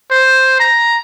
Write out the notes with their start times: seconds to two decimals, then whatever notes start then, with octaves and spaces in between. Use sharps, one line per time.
0.11 C5
0.60 A#5